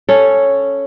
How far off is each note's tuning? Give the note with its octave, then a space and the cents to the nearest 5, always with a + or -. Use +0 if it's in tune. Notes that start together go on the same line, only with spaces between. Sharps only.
C#4 +0 A4 +0